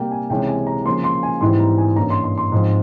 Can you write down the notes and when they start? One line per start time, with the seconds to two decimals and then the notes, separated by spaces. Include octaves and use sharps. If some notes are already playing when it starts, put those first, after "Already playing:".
Already playing: C3 G3 A#3 G5
0.12 G#5
0.30 C#2 C3 E3 G#3 C#4 G5
0.49 G#5
0.67 A#5
0.85 C#3 F3 A#3 C6
1.04 C6
1.23 G#5
1.41 G#2 E3 G3 C4 E4 C6
1.60 A#5
1.78 G#5
1.96 G2 E3 A#3 C#4 A#5
2.10 C6
2.24 C6
2.38 C6
2.52 G#2 F3 C4